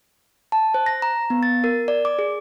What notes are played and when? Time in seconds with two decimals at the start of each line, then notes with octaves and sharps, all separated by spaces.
0.52 A5
0.74 C5
0.86 A#6
1.02 A#5
1.30 B3
1.43 A6
1.64 A#4
1.88 D5
2.05 D6
2.19 G#4